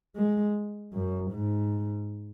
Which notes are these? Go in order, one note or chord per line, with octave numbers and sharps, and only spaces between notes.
G#3
F#2
G#2